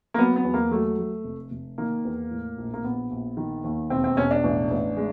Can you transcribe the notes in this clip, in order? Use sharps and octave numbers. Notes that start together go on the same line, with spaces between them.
A#3
F#3 B3
B3
E2
A#3
F#3 A3
A3
F1
F1
D#3 A#3
E2
A2
A#1
A#3
A#1 B3
A#1
D#3
D#2
E1 C4
C4
E1 C#4
D4
A1
A1
G#3